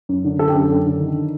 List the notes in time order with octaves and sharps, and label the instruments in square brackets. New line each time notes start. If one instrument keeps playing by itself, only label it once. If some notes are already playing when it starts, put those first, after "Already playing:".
[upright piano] F#2
D3
D3 A4
G4
F#2 A4
F#2
D3
D#3